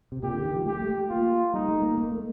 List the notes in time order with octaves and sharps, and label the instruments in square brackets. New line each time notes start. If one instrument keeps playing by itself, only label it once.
[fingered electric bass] C3
[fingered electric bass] A#2 [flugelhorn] G4
[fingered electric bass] D3
D#3
F3
[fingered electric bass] A3 [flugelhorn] G4
[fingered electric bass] G3
A3
[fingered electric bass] A#3 [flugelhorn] F4
[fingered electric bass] G3 [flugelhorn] D#4
[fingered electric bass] A3
A#3
A#3
A3